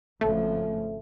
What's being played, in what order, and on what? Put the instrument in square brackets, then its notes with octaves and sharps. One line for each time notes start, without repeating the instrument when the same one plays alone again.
[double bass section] G#1 C#3 F3 [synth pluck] A3 [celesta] A4 E5